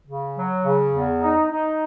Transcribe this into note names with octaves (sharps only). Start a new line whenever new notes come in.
C#3
F#3
C#3
E2
D#4
D#4